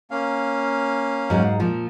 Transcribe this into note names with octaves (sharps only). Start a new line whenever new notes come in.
A#3 C#4 F5
G#2 F#3 G#3
A#2 F3